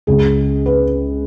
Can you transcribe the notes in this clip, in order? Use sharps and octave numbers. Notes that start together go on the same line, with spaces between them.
C#2 C#3 G#3 C#4 G#4
B4